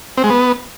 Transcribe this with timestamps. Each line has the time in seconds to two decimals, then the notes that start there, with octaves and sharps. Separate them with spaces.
0.17 C4
0.24 G#3
0.30 B3